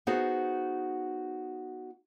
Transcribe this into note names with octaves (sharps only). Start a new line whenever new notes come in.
B3 D#4 F#4 G#4 C5